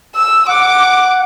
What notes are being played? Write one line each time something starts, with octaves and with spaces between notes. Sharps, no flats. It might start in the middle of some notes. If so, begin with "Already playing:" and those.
E6
F#5 D6